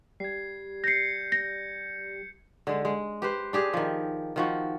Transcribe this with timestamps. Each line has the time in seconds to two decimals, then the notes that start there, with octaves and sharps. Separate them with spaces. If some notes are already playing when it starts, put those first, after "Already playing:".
0.20 G3 G#6 C7
0.84 G6 A#6 C7 C#7
1.32 A#6
2.67 D3 G#3
2.85 G#3
3.22 G4 B4 C5
3.53 D4 G4 G#4
3.73 D#3 F3
4.36 D#3 F3 F#4